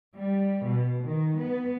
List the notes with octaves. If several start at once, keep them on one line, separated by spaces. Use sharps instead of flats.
G3
B2
D#3
B3